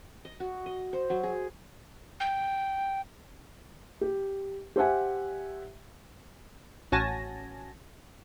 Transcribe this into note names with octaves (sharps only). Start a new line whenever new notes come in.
D#5
F#4
D#5
C5
F#3
G#4
G5
G4
G4 C5 E5 F#5 G#5
A1 C#4 F#4 G#5 A5 A#6